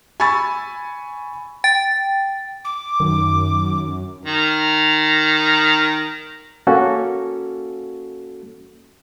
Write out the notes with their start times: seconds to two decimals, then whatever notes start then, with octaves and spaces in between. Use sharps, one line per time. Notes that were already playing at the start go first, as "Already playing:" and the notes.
0.20 G#5 B5 C#6 E6 G#6 A6
1.64 G5 A6
2.65 D6
3.00 F#2 D#3
4.25 D#3 A#4
6.67 A#3 C#4 F#4 A4